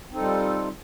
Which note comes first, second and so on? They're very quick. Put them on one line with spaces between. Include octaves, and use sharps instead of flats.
C4 D#4 A4 G3 F4